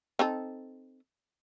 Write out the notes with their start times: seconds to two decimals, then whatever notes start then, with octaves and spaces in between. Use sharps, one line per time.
0.19 C4 D#4 A4